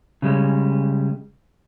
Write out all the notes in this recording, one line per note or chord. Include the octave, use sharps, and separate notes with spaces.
C#3 G3 G#3